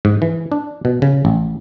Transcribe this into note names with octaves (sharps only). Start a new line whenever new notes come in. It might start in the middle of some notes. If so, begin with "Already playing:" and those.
G#2
E3
D4
B2
C#3
A1